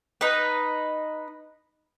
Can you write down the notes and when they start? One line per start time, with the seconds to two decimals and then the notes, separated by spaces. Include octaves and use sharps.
0.21 D#4 B4